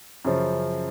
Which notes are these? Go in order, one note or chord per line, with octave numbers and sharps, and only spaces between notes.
F#2 C#3 F3